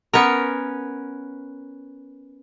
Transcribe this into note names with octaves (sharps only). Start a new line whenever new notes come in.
B3 C#4 A#4